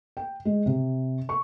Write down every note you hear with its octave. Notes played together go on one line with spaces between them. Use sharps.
G5
G#3
C3
C#6